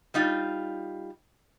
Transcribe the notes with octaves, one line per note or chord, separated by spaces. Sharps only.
G3 D#4 F4